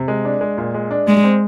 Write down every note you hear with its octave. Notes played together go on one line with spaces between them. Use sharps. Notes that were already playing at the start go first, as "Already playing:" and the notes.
Already playing: C3
G#3
D4
G#3
A#2
G#3
D4
G#3 D5
C4